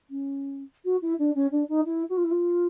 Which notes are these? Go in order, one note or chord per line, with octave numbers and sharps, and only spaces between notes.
C#4
F#4
E4
D4
C#4
D4
D#4
E4
F#4
F4
E4
F4